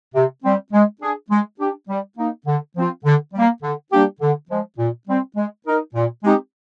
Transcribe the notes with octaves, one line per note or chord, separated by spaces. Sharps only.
C3
G3 C4
G#3
D4 G#4
G#3
D4 G4
G3
A#3 D#4
D3
F3 C4 F4
D3
G3 A#3
D3
G3 A#3 D4 G4
D3
F3 G#3
A#2
G3 C4
G#3
D#4 A#4
A#2
G#3 C4 D#4 G4